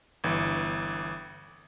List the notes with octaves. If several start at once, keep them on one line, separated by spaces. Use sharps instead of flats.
G1 E3